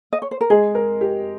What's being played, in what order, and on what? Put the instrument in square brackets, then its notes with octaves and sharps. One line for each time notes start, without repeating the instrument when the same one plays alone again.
[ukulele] D#5
C#5
C5
A#4
[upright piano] G#3 [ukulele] G#4
[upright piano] A#4
G4